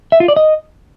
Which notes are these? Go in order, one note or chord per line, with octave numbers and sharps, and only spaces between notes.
E5
F4
D5
D#5